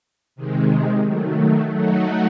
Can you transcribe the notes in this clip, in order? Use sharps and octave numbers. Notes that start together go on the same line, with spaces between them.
C3 D#3 G#3
D#3 F#3 A3
F#3 A3 D#4 F#4